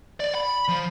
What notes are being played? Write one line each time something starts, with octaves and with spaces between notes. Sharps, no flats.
D5
B5
F3